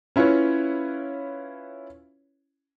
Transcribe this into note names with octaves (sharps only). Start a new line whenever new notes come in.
C#4 E4 F4 B4 C#5